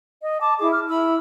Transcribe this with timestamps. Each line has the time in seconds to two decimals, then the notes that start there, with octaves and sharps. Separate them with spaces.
0.22 D#5
0.41 A5 D6
0.59 E4 G#4 D6
0.72 F6
0.89 E4 B5 E6